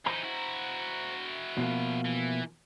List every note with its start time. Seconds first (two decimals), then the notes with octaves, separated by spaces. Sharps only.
0.06 E3 D#4 C5 A#5
0.24 E4 F#4
1.57 B2 F3 A#3
2.05 E3